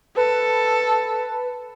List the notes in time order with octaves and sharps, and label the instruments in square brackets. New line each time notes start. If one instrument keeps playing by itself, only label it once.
[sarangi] A4 [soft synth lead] B4